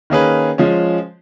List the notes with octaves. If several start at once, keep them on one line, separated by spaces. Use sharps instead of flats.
D#3 A#3 C#4 G#4 B4
F3 G#3 C#4